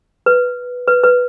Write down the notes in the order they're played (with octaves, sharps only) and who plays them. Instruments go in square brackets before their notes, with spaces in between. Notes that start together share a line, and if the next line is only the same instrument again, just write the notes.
[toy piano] B4
B4
B4